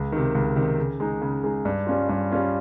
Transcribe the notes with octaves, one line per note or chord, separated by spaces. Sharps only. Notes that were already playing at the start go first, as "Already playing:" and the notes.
Already playing: C#2
C3 D#3
C#2
C3 D#3
C#3
G#3 D#4
C#3
G#3 D#4
G2
G3 C#4 F4
G2
G3 C#4 F4